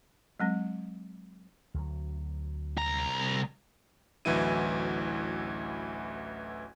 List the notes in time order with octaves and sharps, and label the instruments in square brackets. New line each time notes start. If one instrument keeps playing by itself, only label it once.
[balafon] F#3 G#3 C4
[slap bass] D2 F#3
[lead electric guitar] C2 A#5
[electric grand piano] A1 D2 E3 F#3 E4 D#7